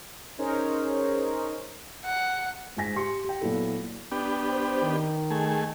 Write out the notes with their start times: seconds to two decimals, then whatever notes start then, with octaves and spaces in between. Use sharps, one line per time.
0.38 C#4 D#4 G#4 A#4 C5 C#5
2.04 F#5
2.77 G#2 F4 G#5 A#6 B6
2.96 G4 C6 C#7
3.25 G4 G5
3.41 A#2 F#3 B3 E4 A4
4.11 B3 D4 G4
4.50 C5
4.83 D#3
5.31 A3 G#4